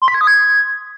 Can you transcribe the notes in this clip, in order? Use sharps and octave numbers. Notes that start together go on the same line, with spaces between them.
C6
B6
G#6
D#6
G#6